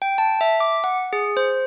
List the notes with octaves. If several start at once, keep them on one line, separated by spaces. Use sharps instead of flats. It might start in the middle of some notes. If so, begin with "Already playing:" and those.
G5
A5
E5
D6
F#5
G#4
C5